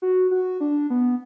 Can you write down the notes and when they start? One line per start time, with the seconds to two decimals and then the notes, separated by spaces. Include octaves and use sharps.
0.02 F#4
0.31 F#4
0.60 D4
0.90 B3